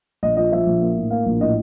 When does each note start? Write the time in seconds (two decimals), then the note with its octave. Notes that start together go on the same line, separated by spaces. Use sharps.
0.23 A#1 D#5
0.37 F3 D#5
0.52 F3 E5
0.67 A#1
0.81 A#3
0.96 A2
1.10 A#3 F5
1.26 A#1
1.40 A2 D#5